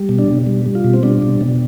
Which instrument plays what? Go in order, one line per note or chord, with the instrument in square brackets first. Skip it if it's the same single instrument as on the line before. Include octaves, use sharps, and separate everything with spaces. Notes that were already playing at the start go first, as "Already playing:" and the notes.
Already playing: [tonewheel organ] G3
B2
D4
B2
G3
G3
F4
B2
C4
G3 D4
B2
B2